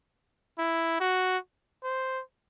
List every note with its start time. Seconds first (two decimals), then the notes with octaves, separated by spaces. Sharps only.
0.58 E4
1.00 F#4
1.83 C5